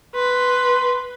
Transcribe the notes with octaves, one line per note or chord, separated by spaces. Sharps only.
B4 C6